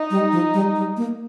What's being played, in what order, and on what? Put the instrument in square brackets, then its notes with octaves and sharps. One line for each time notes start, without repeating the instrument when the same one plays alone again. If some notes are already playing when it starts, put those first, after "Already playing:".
Already playing: [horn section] D#4
[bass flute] G3
F3
G3
G3
A#3